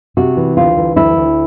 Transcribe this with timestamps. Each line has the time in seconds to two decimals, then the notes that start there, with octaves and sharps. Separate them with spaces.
0.17 C3 F#4
0.37 E3
0.57 D2 F4
0.77 E3
0.96 D2 E4
1.17 D2